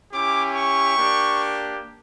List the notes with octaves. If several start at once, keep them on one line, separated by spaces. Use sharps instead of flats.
C#4 E4 G4 D6
C#6
A#3 D4 G4